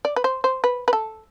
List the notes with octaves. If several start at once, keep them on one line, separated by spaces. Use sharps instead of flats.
D5
B4
C5
C5
B4
B4
A4